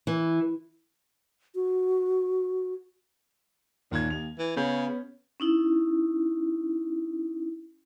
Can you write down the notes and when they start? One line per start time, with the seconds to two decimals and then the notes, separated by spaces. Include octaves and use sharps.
0.07 E3
1.55 F#4
3.92 D#2 A#2 G#6
4.10 D#2 F7
4.38 E3
4.56 C#3 B3 C#4 G6
5.40 C#4 D#4 E4